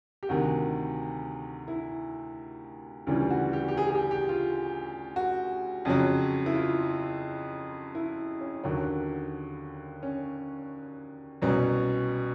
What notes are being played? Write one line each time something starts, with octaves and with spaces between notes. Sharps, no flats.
G4
D2 C3 D#3 F#4
E4
D2 C#3 E3 G3 F4
F#4
G4
G4
G#4
G#4
G4
G4
F4
F#4
F2 C#3 F#3
E4
F4
E4
C#4
D#2 D3 F#3
C#4
C2 B2 F#3 C#4